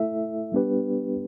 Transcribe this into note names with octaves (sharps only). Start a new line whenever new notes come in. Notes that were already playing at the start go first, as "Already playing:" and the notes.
Already playing: A3 E4 A4 E5
G3 B3 D4 G4 B4